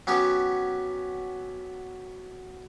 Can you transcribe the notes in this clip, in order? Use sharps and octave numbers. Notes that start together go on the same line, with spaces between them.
F#3 B3 C#4 G4